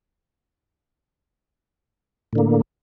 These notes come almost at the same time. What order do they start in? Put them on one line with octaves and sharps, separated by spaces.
A2 D3 A#3